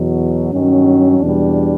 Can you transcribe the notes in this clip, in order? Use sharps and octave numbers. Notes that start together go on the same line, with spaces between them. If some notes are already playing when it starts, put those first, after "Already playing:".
Already playing: E2 B2 F#3
G2 D#3 F#3 C#4
E2 B2 G3 D4